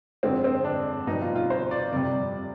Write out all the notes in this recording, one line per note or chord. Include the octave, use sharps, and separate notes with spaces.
F2 D3 G#3 C4
C4
D4
B2 G3 D#4
F4
F4
C5
D5
F2 C3 G3 D5